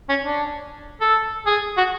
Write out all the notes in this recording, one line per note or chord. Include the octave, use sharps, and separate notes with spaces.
C#4
D4
A4
G#4
F#4